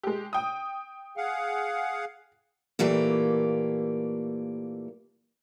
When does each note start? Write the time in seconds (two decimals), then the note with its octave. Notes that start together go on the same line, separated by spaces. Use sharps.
0.03 G#3 G4
0.33 G5 D#6
1.17 G#4 F5 F#5
2.79 A#2 E3 A3 A#3 G4